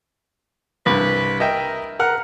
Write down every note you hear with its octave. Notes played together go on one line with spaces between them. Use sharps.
C2 G2 B4
A#4 D#5 E5 G5
A#4 F#5 F6